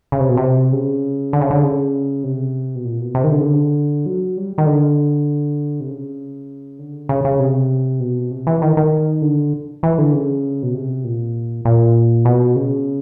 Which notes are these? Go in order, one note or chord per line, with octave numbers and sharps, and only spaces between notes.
C#3
C3
B2
C3
C#3
D3
C#3
D3
C#3
C3
B2
A#2
B2
C3
D#3
D3
C#3
D3
F#3
G3
D#3
D3
C3
C#3
D3
C#3
C#3
C3
B2
C3
E3
D#3
D#3
D3
E3
D3
C#3
B2
C3
A#2
A#2
B2
C#3